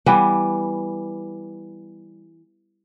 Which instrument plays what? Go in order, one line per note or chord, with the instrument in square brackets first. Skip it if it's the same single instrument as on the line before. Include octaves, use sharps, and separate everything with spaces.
[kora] E3 G3 B3